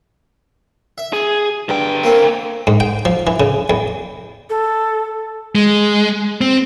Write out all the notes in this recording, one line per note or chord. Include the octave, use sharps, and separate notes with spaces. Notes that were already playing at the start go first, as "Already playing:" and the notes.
E5
G#4
G2 D3 G5
A#3 C4
G#2
G5
F3
E3
C#3
E2
A4
G#3
C4